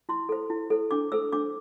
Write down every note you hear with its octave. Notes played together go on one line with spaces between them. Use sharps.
E4 C6
A4 C5
E4
A4 C5
D4 D6
A4 C5 E6
D4 D6